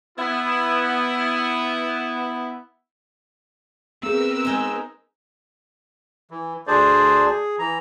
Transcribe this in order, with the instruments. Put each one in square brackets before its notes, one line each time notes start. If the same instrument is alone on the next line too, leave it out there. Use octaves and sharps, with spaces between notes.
[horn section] B3 E4
[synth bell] B3 G#4 [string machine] C4 A#4 B4 [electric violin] E6
[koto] G#3 D#4
[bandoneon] E3
D2 D4 G#4 C5 D5
G#4
E3 A#5